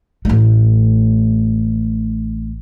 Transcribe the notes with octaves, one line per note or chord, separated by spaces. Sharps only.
A1 A3